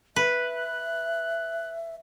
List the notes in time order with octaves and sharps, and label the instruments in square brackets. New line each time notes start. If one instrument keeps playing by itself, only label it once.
[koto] B4 [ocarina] E5 [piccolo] F#6